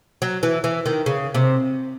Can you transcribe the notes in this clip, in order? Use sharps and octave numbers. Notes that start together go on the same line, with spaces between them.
F#3
E3
E3
D#3
C#3
C3